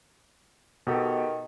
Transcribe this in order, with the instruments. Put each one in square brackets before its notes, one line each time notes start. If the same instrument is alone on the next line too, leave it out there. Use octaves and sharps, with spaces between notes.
[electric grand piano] B2 G4 A4 [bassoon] D#3